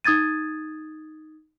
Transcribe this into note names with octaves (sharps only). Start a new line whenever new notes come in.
D#4 D#6 G#6 A6 D#7